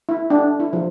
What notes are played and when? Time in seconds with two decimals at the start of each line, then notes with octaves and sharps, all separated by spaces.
0.09 E4
0.30 D4
0.60 E4
0.73 F3